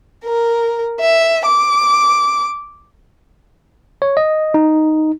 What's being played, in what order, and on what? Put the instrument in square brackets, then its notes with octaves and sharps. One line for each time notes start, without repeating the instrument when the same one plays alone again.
[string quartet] A#4
E5
D6
[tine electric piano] C#5
D#5
D#4